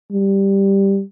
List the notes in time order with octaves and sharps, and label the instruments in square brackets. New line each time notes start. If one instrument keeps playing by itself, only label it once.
[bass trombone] G3